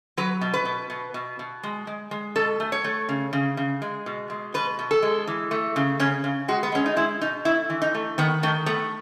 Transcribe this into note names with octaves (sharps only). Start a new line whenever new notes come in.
F#3 B4
B2
B4
B2
B2
B2
B2
G#3
G#3
G#3
B2 A4
A3
C#5
A3
C#3
C#3
C#3
G#3
B2
G#3
B2 B4
B2
A4
G#3
E3
A3
C#3
C#3 C#4
C#3
G#3 F#4
B3
G#3 C#4
D#4
G#3 E4
B2 D#4
A3 E4
E3
D#4
A3
D#3 B3
D#3 A3
A3 B3